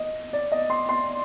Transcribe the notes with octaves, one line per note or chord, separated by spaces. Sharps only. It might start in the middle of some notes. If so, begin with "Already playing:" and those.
Already playing: D#5
D5
D#5
C6
C6